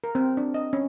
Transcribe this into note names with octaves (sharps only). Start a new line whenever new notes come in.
A#4
C4
D4
D#5
C#4